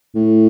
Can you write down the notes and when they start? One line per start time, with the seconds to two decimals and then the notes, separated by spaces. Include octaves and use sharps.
0.15 A2